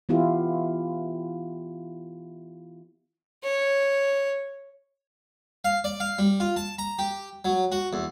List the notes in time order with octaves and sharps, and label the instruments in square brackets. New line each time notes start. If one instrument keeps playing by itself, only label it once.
[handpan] E3 B3 E4 F4 G4
[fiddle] C#5
[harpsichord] F5
D5
F5
G3
F4
A5
A#5
G4
F#3
F#4
E2